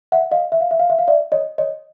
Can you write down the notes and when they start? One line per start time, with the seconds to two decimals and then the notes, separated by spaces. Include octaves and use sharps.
0.12 E5 F#5
0.32 D#5 F5
0.52 E5
0.61 F5
0.71 E5
0.80 F5
0.90 E5
0.98 F5
1.08 D5 E5
1.32 C#5 D#5
1.58 C#5 D#5